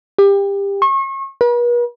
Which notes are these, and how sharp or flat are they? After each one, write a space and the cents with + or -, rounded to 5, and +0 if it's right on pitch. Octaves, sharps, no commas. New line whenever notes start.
G4 +25
C#6 -35
B4 -45